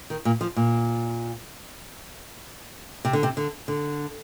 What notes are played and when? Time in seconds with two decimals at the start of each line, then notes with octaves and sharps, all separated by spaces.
0.10 D#3
0.25 A#2
0.41 F3
0.56 A#2
3.05 C3
3.13 D3
3.23 C3
3.37 D3
3.68 D3